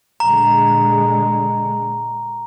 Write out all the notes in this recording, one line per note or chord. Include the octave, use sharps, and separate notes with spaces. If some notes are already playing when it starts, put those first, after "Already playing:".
A#2 D3 G#3 A#5